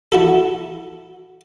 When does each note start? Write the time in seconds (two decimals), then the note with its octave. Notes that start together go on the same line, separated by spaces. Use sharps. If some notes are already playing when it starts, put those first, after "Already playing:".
0.12 E4 F#4 A4